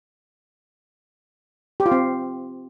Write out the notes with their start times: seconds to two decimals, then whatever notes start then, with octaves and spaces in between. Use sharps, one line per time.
1.80 G4
1.86 F4
1.92 C4